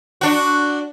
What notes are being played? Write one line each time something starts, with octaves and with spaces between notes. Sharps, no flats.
D4 F#4